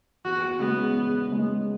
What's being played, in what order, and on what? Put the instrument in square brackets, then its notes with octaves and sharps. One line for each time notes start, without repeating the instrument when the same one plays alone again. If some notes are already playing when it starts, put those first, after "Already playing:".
[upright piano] E2 [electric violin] F#4
[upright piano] C#3 G#3 [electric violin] B3
[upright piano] E2
C#3 G#3